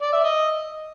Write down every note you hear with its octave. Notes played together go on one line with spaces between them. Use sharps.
D5
E5
D#5